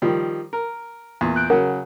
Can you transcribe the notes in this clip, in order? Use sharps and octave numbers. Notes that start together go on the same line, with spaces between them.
D#3 F3 G3
A#4
E2 A#2
F#6 G6 D7
C#3 F#3 A#4 F#5